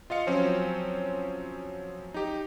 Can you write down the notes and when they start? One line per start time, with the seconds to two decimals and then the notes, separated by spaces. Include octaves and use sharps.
0.10 F4 D#5 F5 C#7
0.27 F3 F#3 C4 C#4
2.14 D#4 G4